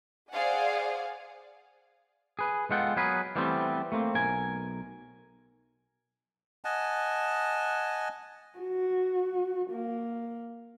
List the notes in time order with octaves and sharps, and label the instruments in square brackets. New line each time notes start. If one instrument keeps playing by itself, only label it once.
[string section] G#4 C5 D5 F5 F#5 G#5
[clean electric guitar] G#4 B4
G#3 B3 F4 A4 F#5 G5
F#3 B3 G#4 A#4 B4
E3 G3 A3 B3 C4 G4
A3 A#3 C4
B1 A#4 G#5
[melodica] D#5 F#5 G#5 A5
[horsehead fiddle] F#4
A#3